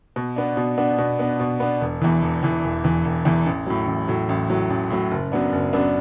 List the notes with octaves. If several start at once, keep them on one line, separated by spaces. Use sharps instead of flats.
B2
B3 D4
B2
B3 D4
B2
B3 D4
B2
B3 D4
E1
E2 E3
E1
E2 E3
E1
E2 E3
E1
E2 E3
A1
A2 F#3
A1
A2 F#3
A1
A2 F#3
A1
A2 F#3
F#1
F#2 F#3 B3 D4
F#1
F#2 F#3 B3 D4